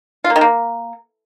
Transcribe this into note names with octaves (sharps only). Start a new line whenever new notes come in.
F4
A#3
D#3
A#3